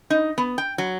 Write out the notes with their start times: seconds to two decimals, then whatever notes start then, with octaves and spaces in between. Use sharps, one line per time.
0.10 D#4
0.38 B3
0.58 G5
0.78 F#3